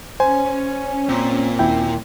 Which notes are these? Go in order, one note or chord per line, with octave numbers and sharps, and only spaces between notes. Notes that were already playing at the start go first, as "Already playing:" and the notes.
C#4 C5 G#5
A#2 C4
D#2 E4 G5